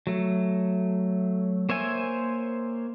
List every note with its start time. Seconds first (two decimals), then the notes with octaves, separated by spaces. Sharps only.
0.07 F#3 A3
1.69 A#3 C5 C#5 E5 G#5